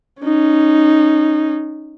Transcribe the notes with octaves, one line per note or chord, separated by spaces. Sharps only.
C#4 D#4